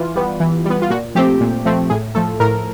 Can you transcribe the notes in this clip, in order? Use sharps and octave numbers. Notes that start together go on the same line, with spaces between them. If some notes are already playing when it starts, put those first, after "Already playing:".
Already playing: E3 F4
G3 B3
E3
G3 B3
F4
A#2 F#4
F3 A3 C4 G4
A#2
F3 A3 C4
A2 G#4
F3 A3 A4
A2 A#4